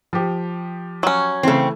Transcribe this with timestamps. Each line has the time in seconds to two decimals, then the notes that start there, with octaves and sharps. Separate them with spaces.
0.13 F3 G4
1.03 F#3 C#4
1.43 C#3 E3 A3 C4